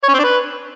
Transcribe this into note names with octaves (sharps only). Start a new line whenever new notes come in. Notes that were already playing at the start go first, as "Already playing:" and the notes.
C#5
C#4
C4
D4
B4